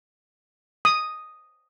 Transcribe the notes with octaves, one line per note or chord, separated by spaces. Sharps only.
D#6